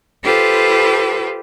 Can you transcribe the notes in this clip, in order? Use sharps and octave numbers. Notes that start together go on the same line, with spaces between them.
F4 G4 A4 B4 C5